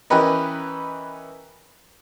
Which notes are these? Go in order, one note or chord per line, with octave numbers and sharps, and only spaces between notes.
E3 C#4 G4 A#4 B4 D#5